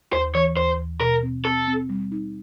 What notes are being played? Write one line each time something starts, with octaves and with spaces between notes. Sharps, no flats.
D#2 C5
E3 C#5
D#2 C5
D#2
B2 A#4
C4
C4 A4
C4
G3
D#4